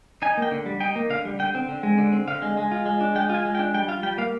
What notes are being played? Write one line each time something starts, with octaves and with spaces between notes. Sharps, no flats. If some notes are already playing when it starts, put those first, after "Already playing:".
D#4 G#5
A#3 G5
D3
G3
D#4 G5
A#3
D3 F5
G3
D3 G5
C4
D3
G#3
D3
C4
D3 F5
G#3
G#3
F4
G#3
D4
G#3 G5
F4
G#5
G#3
G5
D4
G3 G5
F4 F5
G3 G5
A#3 F5